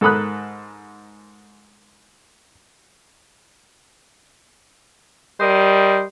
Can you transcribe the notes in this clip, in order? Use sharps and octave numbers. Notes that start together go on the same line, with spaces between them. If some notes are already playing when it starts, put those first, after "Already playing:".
G#2 A4 A#4 B5 D#6 F#6
G3 A#4 C5 D#5